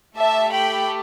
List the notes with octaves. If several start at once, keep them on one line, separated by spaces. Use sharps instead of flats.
A3 G4 E5 A5
G5 B5